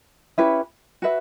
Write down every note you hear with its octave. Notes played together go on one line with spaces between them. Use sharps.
C#4 E4 G4 B4
F#4 B4 E5